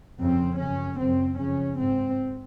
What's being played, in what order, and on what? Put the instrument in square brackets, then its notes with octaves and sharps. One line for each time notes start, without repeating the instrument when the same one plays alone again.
[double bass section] F2 C#3 C4
F#2 C#3 C#4
F#2 C#3 C4
F2 C#3 C#4
G#2 C4